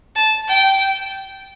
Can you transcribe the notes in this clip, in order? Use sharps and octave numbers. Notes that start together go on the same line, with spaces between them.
A5
G5